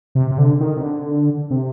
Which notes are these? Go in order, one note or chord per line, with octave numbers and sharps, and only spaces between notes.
C3
C3
D3
D#3
C3
D3
C3